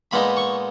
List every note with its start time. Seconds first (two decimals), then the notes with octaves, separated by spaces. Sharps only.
0.11 A#2 G#3 B3 D#4 B5
0.37 C#6